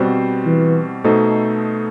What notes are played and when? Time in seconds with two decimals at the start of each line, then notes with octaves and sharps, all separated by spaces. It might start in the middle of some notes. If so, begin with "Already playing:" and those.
Already playing: B2 G3 C4 F#4 C5
0.46 E3
1.04 B2 A3 D#4 A4 C5